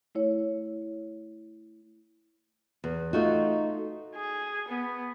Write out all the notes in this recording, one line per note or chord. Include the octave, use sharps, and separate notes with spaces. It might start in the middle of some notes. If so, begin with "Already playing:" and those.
A3 E4 C#5
E2
A3 D#4 F4 F#4
G#4
B3